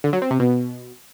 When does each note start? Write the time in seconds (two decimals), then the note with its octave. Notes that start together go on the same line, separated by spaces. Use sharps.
0.04 D3
0.13 F#3
0.22 C4
0.31 C3
0.39 B2